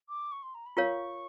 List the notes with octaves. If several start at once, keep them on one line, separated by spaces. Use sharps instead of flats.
D6
C#6
C6
A#5
B5
F4 A#4 C#5 F5 C#6